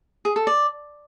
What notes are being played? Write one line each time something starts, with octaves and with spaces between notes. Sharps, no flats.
G#4
A4
D5